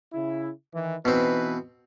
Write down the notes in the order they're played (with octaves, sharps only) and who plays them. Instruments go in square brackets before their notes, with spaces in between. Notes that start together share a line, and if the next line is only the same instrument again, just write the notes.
[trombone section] C#3 E4
D#3 E3
[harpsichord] B2 C4 [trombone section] E3 D#4 B4